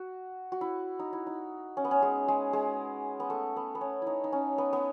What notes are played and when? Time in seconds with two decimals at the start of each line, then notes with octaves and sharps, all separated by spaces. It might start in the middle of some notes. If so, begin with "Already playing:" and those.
Already playing: F#4
0.52 F#4
0.61 E4
0.99 D#4
1.13 E4
1.27 D#4
1.77 C#4
1.85 B3
1.91 C#4
2.02 G#3
2.28 G#3
2.53 G#3
3.20 B3
3.30 A3
3.57 B3
3.75 B3
3.81 C#4
4.02 D#4 E4
4.24 D#4
4.32 C#4
4.58 B3
4.73 B3